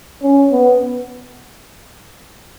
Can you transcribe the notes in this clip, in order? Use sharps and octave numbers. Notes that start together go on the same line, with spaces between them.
C#4
B3